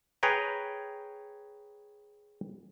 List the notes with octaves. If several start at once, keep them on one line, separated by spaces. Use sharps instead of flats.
G#4 B4 C#5 G5 A#5